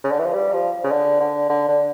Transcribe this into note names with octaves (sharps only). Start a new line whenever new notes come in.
C#3
D3
E3
F3
G3
F3
C#3
D3
D3
D3
D3